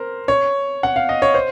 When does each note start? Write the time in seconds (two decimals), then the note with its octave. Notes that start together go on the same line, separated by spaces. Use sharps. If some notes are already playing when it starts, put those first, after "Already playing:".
Already playing: A#4 C5
0.28 C#5
0.83 F#5
0.96 F5
1.09 D#5
1.22 C#5
1.34 C5